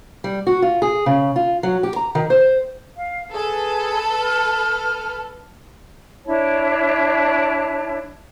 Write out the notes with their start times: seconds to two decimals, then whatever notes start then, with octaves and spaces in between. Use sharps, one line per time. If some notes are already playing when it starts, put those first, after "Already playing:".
0.24 G3
0.47 F#4
0.62 F4
0.82 G#4
1.06 C#3
1.36 F4
1.63 F#3
1.83 G4
1.96 A#5
2.15 D#3
2.30 C5
2.97 F5
3.33 G#4 A4 B4
4.22 F6
6.26 D4 E4 C#5 A5